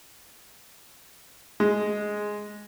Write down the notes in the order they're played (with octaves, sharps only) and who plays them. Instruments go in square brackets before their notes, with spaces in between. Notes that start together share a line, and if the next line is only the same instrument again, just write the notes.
[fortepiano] G#3